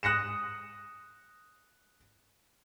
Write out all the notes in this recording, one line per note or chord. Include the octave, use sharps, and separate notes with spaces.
D#6 F#6 A#6 C#7 E7